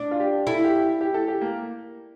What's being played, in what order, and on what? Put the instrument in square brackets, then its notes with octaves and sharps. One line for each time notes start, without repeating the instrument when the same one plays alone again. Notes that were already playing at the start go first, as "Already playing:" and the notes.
Already playing: [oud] D4
[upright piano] F4
G4
[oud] E4 [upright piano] A4
[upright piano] G4
G4
A4
G4
A#3